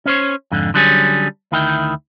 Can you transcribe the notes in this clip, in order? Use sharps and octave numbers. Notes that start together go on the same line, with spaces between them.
C#4 C5 C#5
F2 G#2 D3
D3 F#3 G3 C#4 G#4
D2 D#3 E4 G5